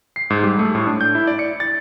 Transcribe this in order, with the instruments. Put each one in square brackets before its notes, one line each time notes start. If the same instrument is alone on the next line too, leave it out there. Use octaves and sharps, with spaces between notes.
[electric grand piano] C7
G#2
G3
A3
A2
D4
G6
E4
D5
C#7
A6